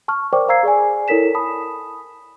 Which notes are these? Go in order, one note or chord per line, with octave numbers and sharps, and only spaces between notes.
A5 C#6 F6
A#4 C5 D5 G5 C#6 D6
C5 F5 A#5 E6 G#6 C7
G#4 D5 G#5
E4 A4 A#4 C#5 B6 E7
A5 B5 D#6